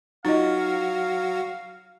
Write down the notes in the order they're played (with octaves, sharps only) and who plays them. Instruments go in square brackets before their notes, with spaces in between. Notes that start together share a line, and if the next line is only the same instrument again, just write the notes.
[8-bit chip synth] F#3 F#4 [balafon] D#4 F4 D#5 [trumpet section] F5